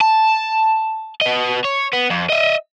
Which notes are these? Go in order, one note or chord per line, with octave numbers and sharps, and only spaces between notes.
A5
B3 D#5
C#5
B3
F2
D#5 E5